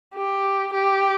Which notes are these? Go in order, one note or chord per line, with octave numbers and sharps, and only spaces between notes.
G4
G4